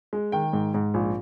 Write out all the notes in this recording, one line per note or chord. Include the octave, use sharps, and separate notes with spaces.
G#3
D#3 G5
G#2
G#2
A#1